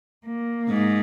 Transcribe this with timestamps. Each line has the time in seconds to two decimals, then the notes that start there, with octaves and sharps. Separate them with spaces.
0.26 A#3
0.69 G#2